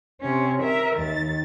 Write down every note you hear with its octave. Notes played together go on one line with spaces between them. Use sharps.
C3 C#4
A#4 E5
D#2 A6